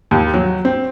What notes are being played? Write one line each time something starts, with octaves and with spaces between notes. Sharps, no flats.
D#2
F#3
C4